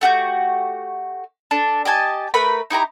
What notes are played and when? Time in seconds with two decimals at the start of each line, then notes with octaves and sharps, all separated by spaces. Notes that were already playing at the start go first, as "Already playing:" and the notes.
0.01 A3 F#4 G4 G6
1.51 D4 A4
1.85 G4 D#5 G#5 A5
2.34 A3 A#4 B4 B5
2.70 D#4 E4 G4 A#5